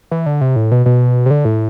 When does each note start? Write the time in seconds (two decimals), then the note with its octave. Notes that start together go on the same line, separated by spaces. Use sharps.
0.11 E3
0.26 D3
0.41 C3
0.56 A2
0.72 B2
0.86 B2
1.26 C3
1.31 D3
1.45 A2